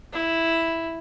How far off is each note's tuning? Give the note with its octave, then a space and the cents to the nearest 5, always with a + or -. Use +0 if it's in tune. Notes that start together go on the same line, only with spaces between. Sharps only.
E4 +0